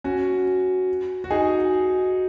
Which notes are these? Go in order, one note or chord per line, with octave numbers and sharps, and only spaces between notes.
C#4 F#4
F#4
D#4 G#4